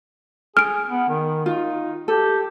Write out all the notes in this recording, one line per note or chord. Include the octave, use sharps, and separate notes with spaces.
G#4 F6 D7
B3
D#3
D#4 F4
G4 A4